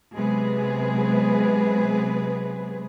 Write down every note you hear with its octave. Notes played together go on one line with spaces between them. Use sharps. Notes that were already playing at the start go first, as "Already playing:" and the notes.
C3 F#3 G#3 B3 G#4 B4